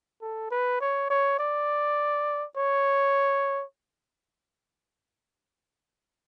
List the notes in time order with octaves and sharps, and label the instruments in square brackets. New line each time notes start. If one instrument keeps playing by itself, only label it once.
[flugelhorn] A4
B4
C#5
C#5
D5
C#5